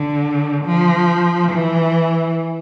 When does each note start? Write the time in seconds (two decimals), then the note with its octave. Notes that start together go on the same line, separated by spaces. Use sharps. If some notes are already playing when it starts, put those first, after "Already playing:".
Already playing: D3
0.66 F3
1.53 E3